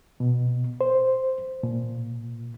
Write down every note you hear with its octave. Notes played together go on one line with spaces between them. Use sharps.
B2
C5
A#2